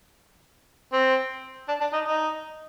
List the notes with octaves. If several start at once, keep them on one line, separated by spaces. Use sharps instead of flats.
C4
D4
D4
D#4
D#4